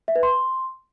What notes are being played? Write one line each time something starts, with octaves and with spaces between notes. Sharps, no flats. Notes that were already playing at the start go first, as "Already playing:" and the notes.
E5
B4
C6